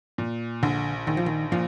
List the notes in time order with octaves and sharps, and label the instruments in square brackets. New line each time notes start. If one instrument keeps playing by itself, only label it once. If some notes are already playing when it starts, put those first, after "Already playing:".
[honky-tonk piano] A#2
[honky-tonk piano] A#1 [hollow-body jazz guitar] D3
[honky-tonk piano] A#1 [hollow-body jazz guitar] D#3
[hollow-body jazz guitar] F3
D#3
[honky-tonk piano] A#2 [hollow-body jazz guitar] F3